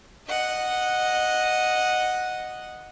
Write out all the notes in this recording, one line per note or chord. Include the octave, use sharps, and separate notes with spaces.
D#5 F#5